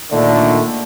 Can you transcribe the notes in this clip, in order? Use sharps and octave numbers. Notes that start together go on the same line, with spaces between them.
A#2 D3 D#3 A3 D4